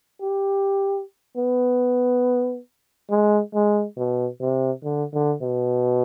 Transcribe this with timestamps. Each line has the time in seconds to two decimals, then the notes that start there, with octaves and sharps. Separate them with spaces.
0.21 G4
1.37 B3
3.10 G#3
3.54 G#3
3.97 B2
4.41 C3
4.84 D3
5.13 D3
5.42 B2